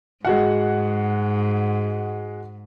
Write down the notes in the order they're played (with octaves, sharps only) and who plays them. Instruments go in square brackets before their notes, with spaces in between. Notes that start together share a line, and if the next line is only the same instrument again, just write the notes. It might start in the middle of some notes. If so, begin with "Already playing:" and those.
[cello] G#2 [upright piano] G#3 F#4 F#5